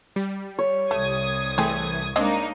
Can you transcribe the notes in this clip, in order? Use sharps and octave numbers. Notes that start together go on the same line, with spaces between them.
G3
C#5
C2 A3 D#6 G#6
E3 A3 C4 G#4
G#3 A#3 C4 D4 D#4 G#4 D#5